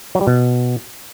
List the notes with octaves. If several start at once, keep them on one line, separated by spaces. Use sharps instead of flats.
F#3
G3
B2